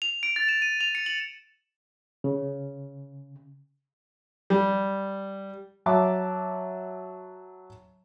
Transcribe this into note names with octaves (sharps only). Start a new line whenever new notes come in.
F7
D7
A6
E7
D#7
F7
C#7
F#7
C#3
G3
F#3 E5 A5 D6